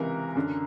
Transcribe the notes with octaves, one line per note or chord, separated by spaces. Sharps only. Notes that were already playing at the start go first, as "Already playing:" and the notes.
Already playing: C#2 C3 E3 A#4
F#2 D3